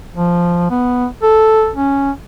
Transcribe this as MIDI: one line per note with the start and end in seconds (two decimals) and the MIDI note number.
0.15 0.67 53
0.71 1.06 59
1.22 1.70 69
1.75 2.11 61